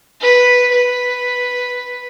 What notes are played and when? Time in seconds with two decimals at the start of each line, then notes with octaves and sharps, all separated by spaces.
0.21 B4
0.72 B4